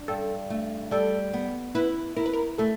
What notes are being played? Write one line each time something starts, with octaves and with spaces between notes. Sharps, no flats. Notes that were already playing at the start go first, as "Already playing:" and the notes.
Already playing: D4
G2 A4
A3
G3 A4
B3
E4 B4
E4 A#4
B4
A#4
A3 A4